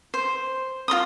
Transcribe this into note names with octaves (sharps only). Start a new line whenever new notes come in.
C5
F4 A#4 C6 D#6